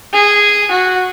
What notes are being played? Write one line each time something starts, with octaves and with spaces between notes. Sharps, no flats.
G#4
F#4